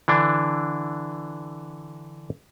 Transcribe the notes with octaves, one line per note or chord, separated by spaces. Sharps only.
D3 E3 D4